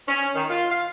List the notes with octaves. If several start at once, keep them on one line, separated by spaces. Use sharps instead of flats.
C#4
D#3
F4
F5